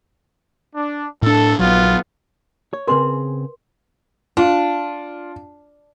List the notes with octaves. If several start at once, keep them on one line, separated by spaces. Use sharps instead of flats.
D4
A2 D4 A4
A#1 F#3 B3 F4
C#5
C#3 C4 G#4 A#4 B4 C6
D4 F4